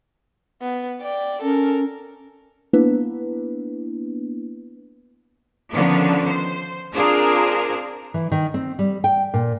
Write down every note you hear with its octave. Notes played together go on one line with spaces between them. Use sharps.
B3
D5 G5
C#4 A4 A#4
A#3 B3 D4 E4 B4
D3 D#3 F3 B3 C#4 D4
C5
C4 D4 F4 G#4 A#4 C5
E3
D#3
C4
G3
G5
A#2